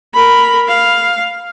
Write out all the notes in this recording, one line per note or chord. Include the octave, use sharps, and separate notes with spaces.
A#4 B5
F5